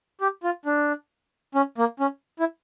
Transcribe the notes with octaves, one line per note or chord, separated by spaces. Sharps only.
G4
F4
D4
C#4
A#3
C#4
E4